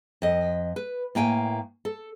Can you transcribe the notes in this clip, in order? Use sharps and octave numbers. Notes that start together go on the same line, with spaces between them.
F2 D#5
B4
A2 A#3 G5 G#5
A4